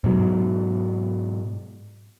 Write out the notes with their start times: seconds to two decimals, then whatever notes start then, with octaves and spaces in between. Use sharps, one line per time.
0.04 G#2 B2 F#3